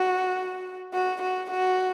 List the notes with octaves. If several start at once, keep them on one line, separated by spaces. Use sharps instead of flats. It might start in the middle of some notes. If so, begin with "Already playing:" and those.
Already playing: F#4
F#4
F#4
F#4